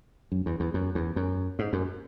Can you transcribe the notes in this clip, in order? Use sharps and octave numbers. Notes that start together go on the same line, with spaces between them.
F#2
E2
E2
F#2
E2
F#2
G#2
F#2